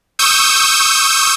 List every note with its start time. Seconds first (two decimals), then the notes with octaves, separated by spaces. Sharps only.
0.19 C#6 D#6 E6 G6